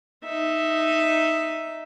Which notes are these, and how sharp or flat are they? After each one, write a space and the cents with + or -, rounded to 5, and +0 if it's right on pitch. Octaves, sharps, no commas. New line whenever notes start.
D#4 +0 E5 +0